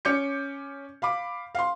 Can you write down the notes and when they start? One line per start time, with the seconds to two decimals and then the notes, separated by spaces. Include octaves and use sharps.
0.05 C#4 D6 G6 C#7
1.02 F5 B5 D6
1.55 F5 C6